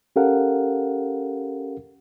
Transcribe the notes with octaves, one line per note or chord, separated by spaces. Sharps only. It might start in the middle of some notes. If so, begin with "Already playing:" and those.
C#4 G4 A4 A#4 F5 F#5